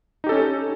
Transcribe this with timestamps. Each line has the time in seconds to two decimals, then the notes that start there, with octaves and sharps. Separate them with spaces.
0.24 D#4
0.26 G4
0.29 A4
0.32 C#4